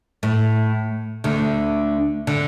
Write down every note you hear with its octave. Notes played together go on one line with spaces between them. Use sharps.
A2
D2 D3
D3